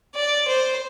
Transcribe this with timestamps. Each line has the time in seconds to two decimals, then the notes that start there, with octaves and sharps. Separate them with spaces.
0.15 D5
0.47 C5